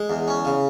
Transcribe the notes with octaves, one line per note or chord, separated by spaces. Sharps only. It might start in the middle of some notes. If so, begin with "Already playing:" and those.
Already playing: G#3
E2
C#4
C#3